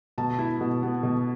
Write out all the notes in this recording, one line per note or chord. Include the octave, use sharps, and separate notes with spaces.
B2 A5
E4
B2
B3
B2